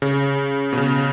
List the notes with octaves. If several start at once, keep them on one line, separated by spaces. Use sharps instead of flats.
C#3
B2
C#3